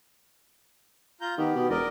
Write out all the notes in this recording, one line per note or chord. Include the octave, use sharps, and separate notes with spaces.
F4 A#5 G6
D#3 B3 G4
B2
E1 A#4 D5 D#5